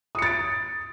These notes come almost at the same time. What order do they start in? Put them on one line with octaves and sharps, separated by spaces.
D#6 C#7 A6 D7